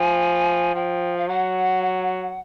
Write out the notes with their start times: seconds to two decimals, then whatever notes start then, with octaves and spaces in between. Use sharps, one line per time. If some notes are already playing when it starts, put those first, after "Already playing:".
Already playing: F3 G#5
0.74 F3 G5
1.17 F5
1.28 F#3 F#5